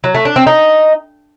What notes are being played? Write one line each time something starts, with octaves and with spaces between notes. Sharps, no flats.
F#3
A3
D4
C4
D#4